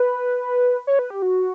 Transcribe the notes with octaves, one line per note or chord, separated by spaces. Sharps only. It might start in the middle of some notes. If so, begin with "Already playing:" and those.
Already playing: B4
C#5
B4
G4
F#4